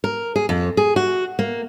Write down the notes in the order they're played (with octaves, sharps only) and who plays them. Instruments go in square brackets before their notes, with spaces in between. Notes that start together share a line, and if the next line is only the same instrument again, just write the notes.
[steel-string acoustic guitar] A#4
G#4
F2
G#4
F#4
A#3